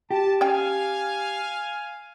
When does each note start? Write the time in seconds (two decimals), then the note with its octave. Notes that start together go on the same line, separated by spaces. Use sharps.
0.11 G4 A5
0.41 C#4 F5 G5 G#5